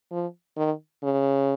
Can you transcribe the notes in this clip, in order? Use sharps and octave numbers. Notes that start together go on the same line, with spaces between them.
F3
D#3
C#3